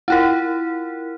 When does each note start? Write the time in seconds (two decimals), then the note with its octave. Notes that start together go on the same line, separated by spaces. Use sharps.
0.08 E4 F4 A#4